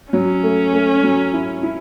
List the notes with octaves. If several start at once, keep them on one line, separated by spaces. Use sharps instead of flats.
F#3 C#4
A3
A3
F#3
E4
E4